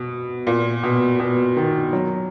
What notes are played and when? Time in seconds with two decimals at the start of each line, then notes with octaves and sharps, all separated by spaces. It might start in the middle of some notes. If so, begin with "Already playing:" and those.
Already playing: B2
0.47 A#2
0.83 B2
1.20 B2
1.57 D#3
1.93 F#3